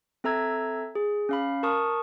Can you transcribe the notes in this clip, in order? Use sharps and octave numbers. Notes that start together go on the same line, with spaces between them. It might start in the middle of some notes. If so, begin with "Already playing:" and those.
C4 A4 E5 A#5 E6 G#6
G#4
C#4 F5 B5
A#4 A5 C#6 D#6